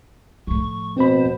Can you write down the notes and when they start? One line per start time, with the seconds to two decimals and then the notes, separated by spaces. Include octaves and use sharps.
0.47 A2 F3 C#6
0.97 B2 C4 C5 B5